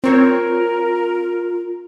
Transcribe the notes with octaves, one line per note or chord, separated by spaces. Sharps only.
C4 F4 A#4 C#5